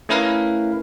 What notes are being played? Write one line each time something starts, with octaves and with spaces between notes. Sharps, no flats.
A3 C#4 E4 A#4 B4 F5